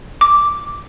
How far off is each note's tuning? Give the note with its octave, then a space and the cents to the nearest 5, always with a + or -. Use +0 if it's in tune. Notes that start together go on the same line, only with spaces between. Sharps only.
D6 -5